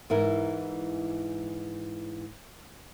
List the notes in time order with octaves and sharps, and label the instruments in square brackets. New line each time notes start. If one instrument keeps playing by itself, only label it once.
[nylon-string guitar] G#2 E3 E4 A#4